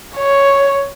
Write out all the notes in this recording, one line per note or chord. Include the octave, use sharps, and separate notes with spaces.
C#5